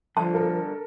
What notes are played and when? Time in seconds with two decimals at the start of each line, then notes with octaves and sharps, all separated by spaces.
0.17 G2 D3 F3 A5
0.34 A4 A#4